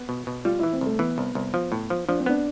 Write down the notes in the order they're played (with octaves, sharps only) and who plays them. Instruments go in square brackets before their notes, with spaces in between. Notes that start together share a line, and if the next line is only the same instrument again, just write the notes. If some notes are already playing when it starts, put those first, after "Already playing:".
Already playing: [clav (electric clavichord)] B3
B2
B2
[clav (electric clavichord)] G3 [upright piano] F4
[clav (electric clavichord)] E3 [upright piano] E4
[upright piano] C4
[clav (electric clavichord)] C2 [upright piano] A3
[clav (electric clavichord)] E3 [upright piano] B3
[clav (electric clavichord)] C2
C2
F3
A2
F3
[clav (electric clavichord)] F3 [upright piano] D4
[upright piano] C4
[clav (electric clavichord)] B3 [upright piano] D4